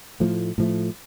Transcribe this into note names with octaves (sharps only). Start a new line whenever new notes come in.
A2 F3 A3
A2 F3 A3